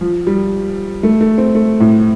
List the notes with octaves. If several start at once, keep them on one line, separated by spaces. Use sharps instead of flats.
F3
G3
A3
A3
C4
A3
A2